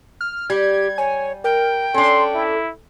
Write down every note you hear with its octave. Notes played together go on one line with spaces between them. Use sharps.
F6
G3 G4 G#6
C#5 G#5
A#4 G5
C#4 D4 A4 C6
E4